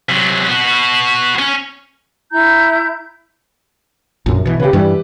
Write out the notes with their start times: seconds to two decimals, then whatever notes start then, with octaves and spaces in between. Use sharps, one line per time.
0.10 C3 F#3
0.48 B3 F#4
1.39 C#4
2.32 E4 A#5 G6
4.26 A#1 F#2
4.46 B2 E3
4.60 C#3 G4 B4
4.73 G2 E3 G3